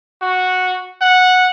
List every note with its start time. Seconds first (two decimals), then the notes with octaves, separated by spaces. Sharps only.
0.22 F#4
1.02 F#5